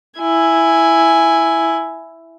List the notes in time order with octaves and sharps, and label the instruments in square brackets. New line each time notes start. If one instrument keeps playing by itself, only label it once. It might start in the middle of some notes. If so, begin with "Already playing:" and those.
[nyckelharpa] E4 G#5